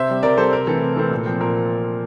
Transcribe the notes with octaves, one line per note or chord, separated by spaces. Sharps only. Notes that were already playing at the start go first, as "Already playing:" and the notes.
Already playing: C3 C5 E5
G3 C4
C3 A#4 D5
G3 C4 A4 C5
C3 A#4
E3 A3 C4 A4
C3
E3 A3 C4
A#2
F3 C4
A#2 A#4